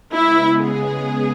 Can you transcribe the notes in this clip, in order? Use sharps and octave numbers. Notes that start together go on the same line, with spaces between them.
C#3 G#3 B3 E4
G#4